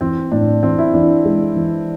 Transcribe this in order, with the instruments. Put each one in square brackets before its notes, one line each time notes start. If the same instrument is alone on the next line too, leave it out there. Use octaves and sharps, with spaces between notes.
[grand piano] E3 [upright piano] C4
[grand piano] A2 [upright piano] D4
[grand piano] E3 [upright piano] C4
[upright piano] E4
[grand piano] E3 [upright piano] D4
[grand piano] G#3
E3